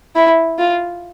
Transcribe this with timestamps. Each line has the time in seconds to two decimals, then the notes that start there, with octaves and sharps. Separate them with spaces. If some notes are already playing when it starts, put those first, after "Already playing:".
0.15 E4
0.59 F4